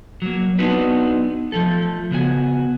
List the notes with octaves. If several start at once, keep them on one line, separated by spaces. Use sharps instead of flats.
F#3 A#3
B3 C4 D4 D#4 F#4 B4
F3 A3 A4
C#3 B3 F#4 G#5